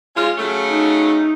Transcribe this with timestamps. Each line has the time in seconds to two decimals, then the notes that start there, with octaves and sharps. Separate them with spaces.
0.15 G#3 C#4 F4
0.38 C#3 F#3 A3
0.70 D#4